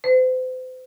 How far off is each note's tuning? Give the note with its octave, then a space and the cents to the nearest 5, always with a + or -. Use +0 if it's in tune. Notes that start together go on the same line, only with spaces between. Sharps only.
C5 -40